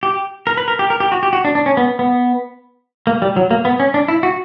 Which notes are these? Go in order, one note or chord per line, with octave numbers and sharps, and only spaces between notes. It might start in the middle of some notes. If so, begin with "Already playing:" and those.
G4
A#4
B4
A#4
G4
A#4
G4
F#4
G4
F#4
D4
D4
C#4
B3
B3
A#3
G3
F#3
A#3
B3
C#4
D4
E4
F#4